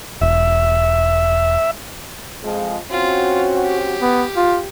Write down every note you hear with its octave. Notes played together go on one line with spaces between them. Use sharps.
E1 E5
F2 F3 G#3
C4 C#4 F4 F#4
G4
B3
F4